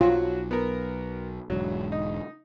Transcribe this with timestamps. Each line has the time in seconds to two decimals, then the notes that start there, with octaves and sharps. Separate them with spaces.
0.01 B1 F#3 F4 F#4
0.51 B3 A#4
1.50 E1 G#2 D3 F#3
1.92 D#4